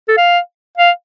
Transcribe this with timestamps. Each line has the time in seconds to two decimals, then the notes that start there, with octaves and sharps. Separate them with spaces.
0.09 A4
0.17 F5
0.78 F5